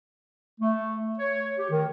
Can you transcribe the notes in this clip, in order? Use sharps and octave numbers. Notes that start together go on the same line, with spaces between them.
A3
C#5
G4
D#3